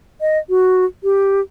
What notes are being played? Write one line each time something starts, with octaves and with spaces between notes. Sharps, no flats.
D#5
F#4
G4